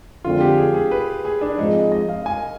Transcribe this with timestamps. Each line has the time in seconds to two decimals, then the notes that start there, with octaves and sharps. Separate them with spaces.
0.24 F2 D3 F3 G#3 C4 F4
0.41 G4
0.57 G#4
0.74 G#4
0.91 B4
1.25 G#4
1.41 D4
1.58 G#2 F3 G#3 C4 D#4
1.92 D#5
2.09 F5
2.26 G#5